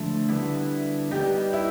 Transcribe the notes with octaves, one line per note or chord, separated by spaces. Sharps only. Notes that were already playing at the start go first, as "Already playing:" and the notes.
Already playing: D3 F3 A3 E4
D3 G3 B3 E4
G3 B3 D#4 G4
E4